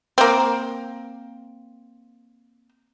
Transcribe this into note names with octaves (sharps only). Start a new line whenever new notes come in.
A#3 C4